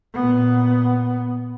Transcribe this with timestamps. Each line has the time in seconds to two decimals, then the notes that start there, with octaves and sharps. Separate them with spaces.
0.14 A#2 B3